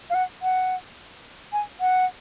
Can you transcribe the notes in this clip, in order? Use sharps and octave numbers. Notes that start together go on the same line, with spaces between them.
F5
F#5
F#5
G#5
F#5